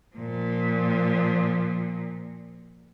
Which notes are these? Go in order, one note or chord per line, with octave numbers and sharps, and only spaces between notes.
A#2 F3